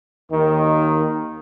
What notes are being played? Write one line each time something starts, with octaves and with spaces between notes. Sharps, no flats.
D#2 D#3